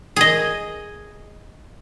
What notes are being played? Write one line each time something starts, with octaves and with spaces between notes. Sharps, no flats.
G#4 D#5